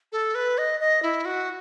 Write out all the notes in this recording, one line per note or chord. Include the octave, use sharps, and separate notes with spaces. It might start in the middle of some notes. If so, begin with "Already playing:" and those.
A4
B4
D#5
D#5
E4
F#4